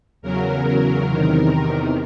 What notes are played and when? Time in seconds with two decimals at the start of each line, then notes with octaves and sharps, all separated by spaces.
0.22 E2 C#3 F#3 A#4
1.07 E2 C3 D#3